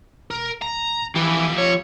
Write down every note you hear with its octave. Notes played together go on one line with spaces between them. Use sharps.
E1 A#4
D1 A#5
D1
E3 F3 G4
C#5